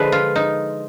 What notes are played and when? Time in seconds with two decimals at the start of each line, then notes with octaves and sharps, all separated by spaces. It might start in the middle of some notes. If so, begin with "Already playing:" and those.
Already playing: D3 F3 G#3 B4
0.12 F4
0.36 D#4